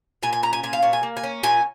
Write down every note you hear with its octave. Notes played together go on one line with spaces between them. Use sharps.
A#2 G#5
G#5
C#4 A#5
G#5
A#2 G#5
F5
A#2 C#5
G#5
A#3
G#5
C#4
A#2 G#5